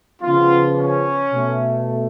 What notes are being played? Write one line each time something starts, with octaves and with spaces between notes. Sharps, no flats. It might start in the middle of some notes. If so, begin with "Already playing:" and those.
C#3 F3 B3 F4
C#4
B2 A3